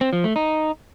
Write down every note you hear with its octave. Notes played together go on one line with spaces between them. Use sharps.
C4
F3
A3
D#4